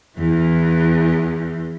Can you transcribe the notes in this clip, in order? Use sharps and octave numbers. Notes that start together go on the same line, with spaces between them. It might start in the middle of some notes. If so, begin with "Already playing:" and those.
E2 E3